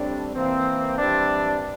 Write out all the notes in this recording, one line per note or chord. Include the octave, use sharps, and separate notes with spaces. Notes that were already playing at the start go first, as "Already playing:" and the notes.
Already playing: A2 G3 C4 D4
E3 A#3 C4
E3 G3 C4 D4